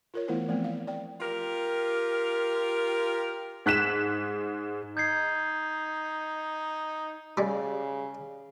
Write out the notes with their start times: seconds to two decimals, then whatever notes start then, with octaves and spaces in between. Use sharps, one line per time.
0.14 F4 A#4 C#5
0.28 E3 A3 B3 E4 A#4 C5
0.48 F3 A3 B3 C4
0.64 F5
0.87 D5 G5
1.21 F4 G4 A#4
3.66 G#2 F#6 B6 E7
4.97 D#4 G6 G#6 C7
7.37 C#3 G3 G#3